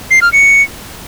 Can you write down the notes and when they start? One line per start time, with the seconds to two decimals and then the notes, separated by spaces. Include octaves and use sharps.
0.11 C7
0.22 F6
0.33 C#7